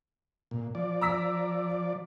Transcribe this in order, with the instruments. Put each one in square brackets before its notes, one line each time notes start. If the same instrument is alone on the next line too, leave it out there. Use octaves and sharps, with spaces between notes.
[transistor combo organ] A#2
F3 D5
[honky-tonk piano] A#5 E6 B6